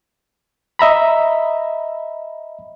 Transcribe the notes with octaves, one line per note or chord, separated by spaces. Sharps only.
D#5 E5 A#5 B5